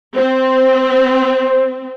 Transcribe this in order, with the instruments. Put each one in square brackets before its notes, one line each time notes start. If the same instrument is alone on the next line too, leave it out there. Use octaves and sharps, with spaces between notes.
[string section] C4 [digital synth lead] C5